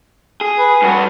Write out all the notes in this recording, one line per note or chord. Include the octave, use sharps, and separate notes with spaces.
G#4
B4
G2 F#4 B4